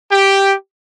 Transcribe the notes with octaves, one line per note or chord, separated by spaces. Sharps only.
G4